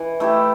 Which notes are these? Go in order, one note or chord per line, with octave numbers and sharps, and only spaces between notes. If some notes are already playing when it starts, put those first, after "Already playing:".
Already playing: E3
A3 E4 G4